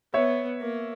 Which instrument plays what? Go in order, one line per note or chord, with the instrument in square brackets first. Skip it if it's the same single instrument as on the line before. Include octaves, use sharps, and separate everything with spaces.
[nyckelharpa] B3 [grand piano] C#5 E5
[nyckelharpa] A#3